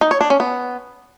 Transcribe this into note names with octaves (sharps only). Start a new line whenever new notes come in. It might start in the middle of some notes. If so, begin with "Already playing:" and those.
D#4
C#5
D4
C#4
B3